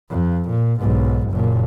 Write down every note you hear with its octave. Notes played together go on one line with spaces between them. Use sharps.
F2
A#2
B1 G#2
F#1 A#2